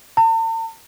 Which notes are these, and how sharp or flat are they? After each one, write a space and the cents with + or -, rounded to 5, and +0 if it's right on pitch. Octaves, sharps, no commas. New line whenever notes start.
A5 +45